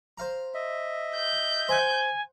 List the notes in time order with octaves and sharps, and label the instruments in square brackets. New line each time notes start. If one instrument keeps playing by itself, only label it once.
[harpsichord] C5 F5 A#5
[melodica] D#5 E5
[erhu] G6
[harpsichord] C5 F#5 [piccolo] G#5